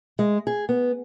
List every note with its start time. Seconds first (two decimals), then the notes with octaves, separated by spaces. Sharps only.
0.19 G#3
0.47 G#4
0.69 B3